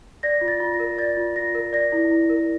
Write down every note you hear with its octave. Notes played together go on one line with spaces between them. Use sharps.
D5 A#6
F4
A6
F4
A#6
A#4
D5 A6
F4
F4 A#6
A#4
D5 A#6
E4
E4
A#4